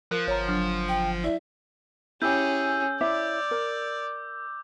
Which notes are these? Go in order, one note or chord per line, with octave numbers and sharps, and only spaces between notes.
F3 A#4 F#6
G1 C#5 A#5
F#3 D4 F6
G5
E4 D5 E5
C#4 E4 G4 G#4 E6 G6
E4 C#5 D5 E5 D6
A#4